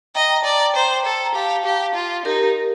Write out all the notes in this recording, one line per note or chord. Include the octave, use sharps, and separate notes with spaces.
D#5 G5 A#5
G5 A#5
A5
D5 G5 A#5
G5 A#5
C5
A4
A#5
G4 F5 A5
F5 A5
G4
F4
D#4 G4 A#4